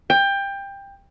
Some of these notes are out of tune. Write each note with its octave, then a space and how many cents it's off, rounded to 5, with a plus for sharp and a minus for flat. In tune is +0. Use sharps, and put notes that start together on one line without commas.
G5 +20